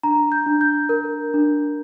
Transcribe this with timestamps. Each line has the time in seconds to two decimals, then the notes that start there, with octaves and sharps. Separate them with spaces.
0.03 D4 A#5
0.32 G6
0.46 D4
0.61 G6
0.89 A#4
1.34 D4